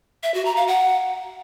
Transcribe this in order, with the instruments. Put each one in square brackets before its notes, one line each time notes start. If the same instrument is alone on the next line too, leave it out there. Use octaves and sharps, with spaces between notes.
[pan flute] E5
F#4
A#5
F5
F#5